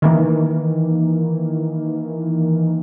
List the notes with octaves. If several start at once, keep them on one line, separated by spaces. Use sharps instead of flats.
D#3 E3 A#3